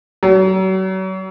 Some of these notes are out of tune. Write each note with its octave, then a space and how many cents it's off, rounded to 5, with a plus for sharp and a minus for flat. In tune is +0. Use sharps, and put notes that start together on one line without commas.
F#3 +35